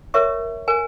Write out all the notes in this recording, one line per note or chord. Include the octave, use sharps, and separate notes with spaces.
A#4 C#5 E5 C#6
A#4 G#5